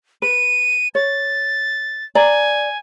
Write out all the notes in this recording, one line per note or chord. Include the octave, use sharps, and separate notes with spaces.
B4 D#7
C#5 A6
D5 G#5 A#5